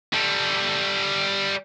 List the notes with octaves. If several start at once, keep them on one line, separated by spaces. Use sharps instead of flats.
G3 A4